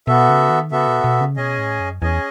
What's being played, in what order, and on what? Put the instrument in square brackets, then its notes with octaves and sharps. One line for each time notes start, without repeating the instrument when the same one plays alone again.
[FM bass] B2 [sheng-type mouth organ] B3 F#4 A4 E5
[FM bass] C#3
D#3
[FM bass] C#3 [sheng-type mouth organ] B3 F#4 A4 E5
[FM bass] B2
B2
C#3
[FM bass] B2 [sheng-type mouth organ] C#4 G#4 D#5 G#5
[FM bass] A2
F#2
[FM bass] E2 [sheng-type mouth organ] C#4 G#4 D#5 G#5